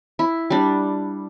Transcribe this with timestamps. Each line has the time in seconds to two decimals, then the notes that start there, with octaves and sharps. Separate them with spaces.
0.19 E4
0.50 G3 D4